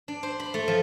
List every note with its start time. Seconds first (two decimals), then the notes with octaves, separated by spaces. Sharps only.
0.08 D4
0.23 C5
0.40 B5
0.54 A3
0.68 F3